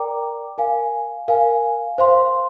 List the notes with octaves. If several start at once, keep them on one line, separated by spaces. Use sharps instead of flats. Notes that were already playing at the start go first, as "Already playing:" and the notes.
Already playing: A#4 D5 G5 A#5 D6
A#4 F5 G#5
A#4 F5 G#5
C5 F5 C6